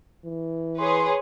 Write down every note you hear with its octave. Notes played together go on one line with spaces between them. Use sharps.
E3
G#4 B4 C#5 C6